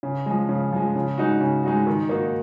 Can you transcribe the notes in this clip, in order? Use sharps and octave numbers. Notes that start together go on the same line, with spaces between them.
C#3
F3 G#3
C#3
F3 G#3
C#3
G#3 D#4 F#4
C#3
G#3 D#4 F#4
D#3
A#3 D#4 F#4